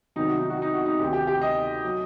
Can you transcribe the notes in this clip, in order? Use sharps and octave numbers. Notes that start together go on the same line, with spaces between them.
C2 C3 D#3 F#3 D#4
F#4
D#4
F#4
D#4
F#4
D#4
D2 C3 D#3 G4
G4
G4
D#5
F#3